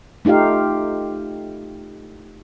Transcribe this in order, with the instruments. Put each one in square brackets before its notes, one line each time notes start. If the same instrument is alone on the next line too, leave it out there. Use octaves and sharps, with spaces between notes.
[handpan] A3 D#4 F4 G4 F5